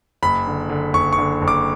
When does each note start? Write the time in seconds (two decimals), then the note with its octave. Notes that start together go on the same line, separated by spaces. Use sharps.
0.22 F#1 B5
0.47 D3
0.70 D3
0.93 F#1 C#6
1.13 C#6
1.19 D3
1.42 F#1
1.48 D6